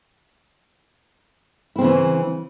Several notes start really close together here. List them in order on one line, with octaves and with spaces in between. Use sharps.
E4 C4 C#3 E3